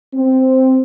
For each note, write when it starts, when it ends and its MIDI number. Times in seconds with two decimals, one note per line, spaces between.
0.15 0.82 60